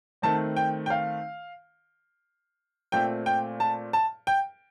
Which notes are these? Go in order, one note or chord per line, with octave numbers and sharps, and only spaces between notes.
D#3 A3 C4 A5
G5
G5
F5
A#2 A3 C4 G5
G5
A5
A5
G5